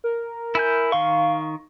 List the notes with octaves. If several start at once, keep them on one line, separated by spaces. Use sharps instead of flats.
A#4
E4 G#5 G6
D#3 F5 C6 C#6